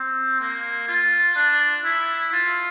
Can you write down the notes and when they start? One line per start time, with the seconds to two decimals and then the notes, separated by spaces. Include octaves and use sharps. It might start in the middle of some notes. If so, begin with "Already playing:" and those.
Already playing: C4
0.40 A#3
0.88 F4
1.36 D4
1.85 E4
2.33 F4